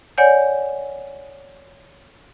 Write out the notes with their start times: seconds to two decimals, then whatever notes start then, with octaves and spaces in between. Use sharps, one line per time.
0.18 C#5 D5 F#5 G#5 G6